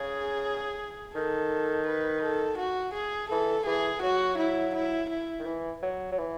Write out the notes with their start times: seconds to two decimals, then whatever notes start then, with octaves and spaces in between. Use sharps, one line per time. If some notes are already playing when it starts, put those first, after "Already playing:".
Already playing: C#3 G#4
1.14 D#3 A4
1.87 B4
2.23 A4
2.58 F#4
2.94 G#4
3.30 E3 A4
3.66 E3 G#4
4.03 F#3 F#4
4.38 E4
4.75 E4
5.10 E4
5.39 D#3
5.46 E3
5.82 F#3
6.12 F#3
6.18 E3